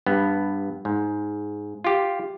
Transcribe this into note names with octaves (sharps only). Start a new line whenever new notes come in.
G2 B3
G#2
F4 G4